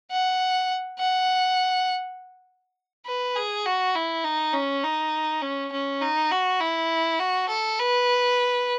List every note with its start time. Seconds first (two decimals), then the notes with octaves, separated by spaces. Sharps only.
0.11 F#5
0.99 F#5
3.06 B4
3.36 G#4
3.66 F#4
3.95 E4
4.24 D#4
4.53 C#4
4.83 D#4
5.42 C#4
5.72 C#4
6.01 D#4
6.31 F#4
6.60 E4
7.19 F#4
7.49 A4
7.79 B4